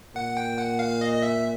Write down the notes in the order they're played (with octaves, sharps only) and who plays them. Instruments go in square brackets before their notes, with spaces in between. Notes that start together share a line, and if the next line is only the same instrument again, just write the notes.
[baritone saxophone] A#2 [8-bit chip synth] F#5
[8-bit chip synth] G5
F#5
F5
D#5
D#5
E5